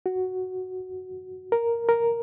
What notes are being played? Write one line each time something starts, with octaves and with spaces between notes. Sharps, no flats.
F#4
A#4
A#4